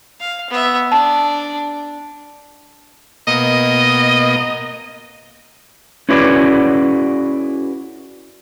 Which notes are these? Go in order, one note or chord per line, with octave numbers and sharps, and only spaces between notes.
F5
B3 E5
D4 A5
B2 A#3 D#5
C#4 E4 F#4 G#4 B4 D5